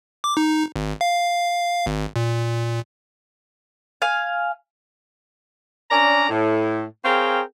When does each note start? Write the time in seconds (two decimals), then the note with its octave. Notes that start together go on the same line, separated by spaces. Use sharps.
0.24 D6
0.37 D#4
0.76 G#1
1.01 F5
1.86 G#1
2.16 A#2
4.02 F5 G#5
5.90 C#4 D4 D5 A#5
6.30 A2
7.04 C4 G#4 A#4 C#5 F5 G5